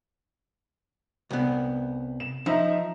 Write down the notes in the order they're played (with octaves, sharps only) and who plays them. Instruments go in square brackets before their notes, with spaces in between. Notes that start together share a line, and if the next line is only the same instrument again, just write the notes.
[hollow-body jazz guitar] C2 B3
[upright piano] E7
[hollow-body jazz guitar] F3 [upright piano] D#4 E5 A#5